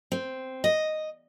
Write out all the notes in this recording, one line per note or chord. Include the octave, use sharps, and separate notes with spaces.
C4
D#5